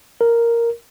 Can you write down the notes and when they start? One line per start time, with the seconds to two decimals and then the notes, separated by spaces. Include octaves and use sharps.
0.21 A#4